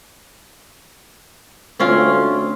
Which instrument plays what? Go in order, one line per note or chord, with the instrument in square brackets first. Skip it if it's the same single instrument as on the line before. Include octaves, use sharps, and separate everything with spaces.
[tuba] D2 [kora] C4 C#4 F4